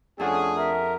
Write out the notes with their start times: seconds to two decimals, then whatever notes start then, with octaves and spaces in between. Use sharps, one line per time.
0.20 F2 A3 C#4 D4 G#4 A4 F#5
0.57 A#4 E5